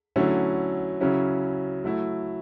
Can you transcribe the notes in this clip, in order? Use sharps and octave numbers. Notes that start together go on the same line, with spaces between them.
D3 F#3 A3 C#4 E4
C#3 F#3 C#4 E4
F#3 A3 E4